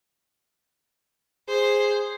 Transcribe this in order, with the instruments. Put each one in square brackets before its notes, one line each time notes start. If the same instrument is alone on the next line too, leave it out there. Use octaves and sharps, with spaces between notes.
[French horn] G#4 [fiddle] C5